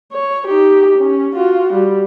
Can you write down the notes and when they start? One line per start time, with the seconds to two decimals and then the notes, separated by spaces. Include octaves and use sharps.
0.12 C#5
0.48 D#4 G4
0.98 C#4
1.34 F4 F#4
1.73 G3